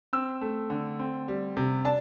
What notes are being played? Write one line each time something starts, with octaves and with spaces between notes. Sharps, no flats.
C4 E6
A3
D3
C4
G3
C3
D4 A5